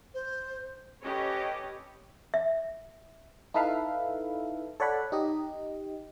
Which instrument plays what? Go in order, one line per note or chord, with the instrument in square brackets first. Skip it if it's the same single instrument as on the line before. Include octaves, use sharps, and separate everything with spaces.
[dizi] C5
[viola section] C#4 G4 A4 B4 C#5 D#5
[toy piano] E5
[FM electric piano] D#4 E4 A4 B4 E5 F5
A4 C#5 D5 F#5 B5
D#4 G4 D#5